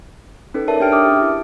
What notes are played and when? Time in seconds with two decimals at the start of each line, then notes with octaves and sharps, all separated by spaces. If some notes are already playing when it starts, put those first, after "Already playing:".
0.54 C#4 D#4 A4 B4
0.68 G#4 A#4 C#5 D5 E5 A5
0.80 D4 D#4 G4 G5 F6 D7
0.92 E5 D6 D#6 F6
1.06 C#4 G4
1.22 E4